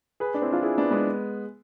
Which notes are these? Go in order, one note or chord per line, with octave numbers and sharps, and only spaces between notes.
G#4 B4
D4
C4 E4
D4 F4
E4 G#4
B3 D4
G#3 B3